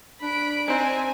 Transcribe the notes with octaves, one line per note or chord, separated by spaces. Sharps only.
D4 B5 D7
C4 D#4 C5 G#5